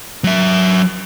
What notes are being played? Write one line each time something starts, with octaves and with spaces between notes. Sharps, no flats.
F#3 E5